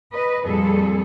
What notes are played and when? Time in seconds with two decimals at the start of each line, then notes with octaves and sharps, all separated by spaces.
0.12 B4 D#5
0.45 F2 A#2 G3 G#4 A4